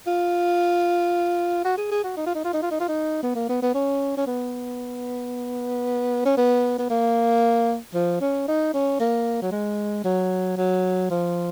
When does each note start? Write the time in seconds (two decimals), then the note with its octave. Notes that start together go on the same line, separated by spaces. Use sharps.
0.07 F4
1.65 F#4
1.78 G#4
1.91 G#4
2.04 F#4
2.17 D#4
2.26 F4
2.35 D#4
2.44 F4
2.53 D#4
2.62 F4
2.71 D#4
2.80 F4
2.88 D#4
3.23 B3
3.35 A#3
3.49 B3
3.62 B3
3.75 C#4
4.17 C#4
4.27 B3
6.25 C#4
6.37 B3
6.78 B3
6.90 A#3
7.94 F3
8.21 C#4
8.48 D#4
8.74 C#4
9.00 A#3
9.42 F#3
9.52 G#3
10.04 F#3
10.58 F#3
11.10 F3